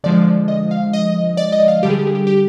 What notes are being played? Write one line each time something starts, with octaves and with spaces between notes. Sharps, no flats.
D3 F3 G#3 D5
D#5
F5
D#5
D5
D#5
F5
D3 G3 G4
G#4
G4
G#4
G4
G4